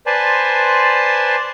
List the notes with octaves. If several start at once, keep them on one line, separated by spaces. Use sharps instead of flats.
B4 C5 D5 G#5 A5 C6